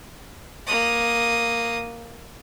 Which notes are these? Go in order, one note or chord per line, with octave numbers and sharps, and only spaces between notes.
A#3 D#6